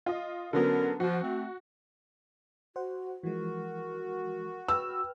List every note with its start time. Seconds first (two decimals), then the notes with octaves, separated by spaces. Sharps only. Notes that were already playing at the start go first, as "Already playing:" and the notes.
0.06 F4 D#5
0.53 D3 F#3 B3 C#4 A#4
1.00 F3 F#4
1.22 A3 C4
2.76 F#4 C5 F#5
3.23 E3 F3 G#3 F#4 A#4
4.68 B4 G5 E6 F6